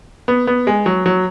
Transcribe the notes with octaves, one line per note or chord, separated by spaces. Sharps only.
B3
B3
G#3
F#3
F#3